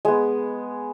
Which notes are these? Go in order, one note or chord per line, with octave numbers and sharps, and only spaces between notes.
G#3 B3